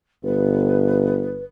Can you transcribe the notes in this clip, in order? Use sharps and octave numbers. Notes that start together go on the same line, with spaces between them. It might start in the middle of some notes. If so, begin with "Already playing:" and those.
G1 B4